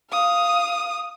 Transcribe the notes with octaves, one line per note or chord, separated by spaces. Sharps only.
F5 D#6